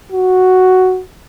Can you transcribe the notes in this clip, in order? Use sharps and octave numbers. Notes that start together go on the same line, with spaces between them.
F#4